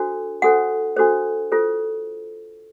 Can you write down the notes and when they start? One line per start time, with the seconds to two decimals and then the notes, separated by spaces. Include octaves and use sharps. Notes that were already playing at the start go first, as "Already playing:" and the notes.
Already playing: D4 F#4 A4 C5
0.42 D4 F#4 A4 C5 F#5
0.97 D4 F#4 A4 C5
1.52 F4 A4 C5